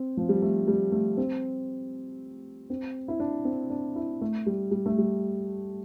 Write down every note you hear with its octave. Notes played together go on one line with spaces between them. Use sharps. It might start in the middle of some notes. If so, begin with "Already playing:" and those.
Already playing: C4
F3
G3
A3
G3
A3
C4
C4
E4
D4
C4
D4
E4
A3
G3
G3
A3
G3